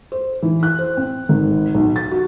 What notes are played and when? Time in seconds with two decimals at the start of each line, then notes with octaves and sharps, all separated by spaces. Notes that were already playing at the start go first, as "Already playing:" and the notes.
0.12 C5
0.42 E3
0.63 F#6
0.79 C5
0.97 C4
1.29 G#1
1.74 B1
1.96 A6
2.11 F#4